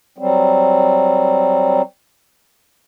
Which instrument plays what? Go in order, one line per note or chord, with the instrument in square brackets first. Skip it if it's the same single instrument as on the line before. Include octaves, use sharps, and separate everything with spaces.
[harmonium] F#3 G3 C4